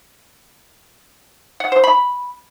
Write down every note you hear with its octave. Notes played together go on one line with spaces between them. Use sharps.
F#5
C5
B5